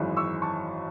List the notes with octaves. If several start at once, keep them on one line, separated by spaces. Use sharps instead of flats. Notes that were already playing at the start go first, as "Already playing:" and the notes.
Already playing: G#1 F#2 E3 G#3
C#6 E6
A5 C#6